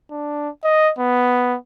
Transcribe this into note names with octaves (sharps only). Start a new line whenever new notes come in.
D4
D#5
B3